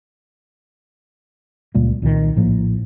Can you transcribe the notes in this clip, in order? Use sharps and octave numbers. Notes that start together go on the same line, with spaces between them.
C#2 A#2 G3 A#3
C2 A#2 D3 D#3
A#1 A2 F3 A#3